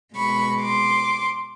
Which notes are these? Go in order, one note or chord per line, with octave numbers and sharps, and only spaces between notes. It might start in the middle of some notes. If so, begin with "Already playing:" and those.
B2 G#3 B5 C#6
C6 D6